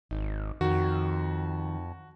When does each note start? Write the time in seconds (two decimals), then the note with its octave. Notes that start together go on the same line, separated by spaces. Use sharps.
0.11 G#1 D#4
0.61 F2 D#3 F#4